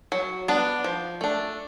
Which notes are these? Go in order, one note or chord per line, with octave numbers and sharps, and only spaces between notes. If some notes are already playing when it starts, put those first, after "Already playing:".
F#3
B3 D4
F3
A3 D4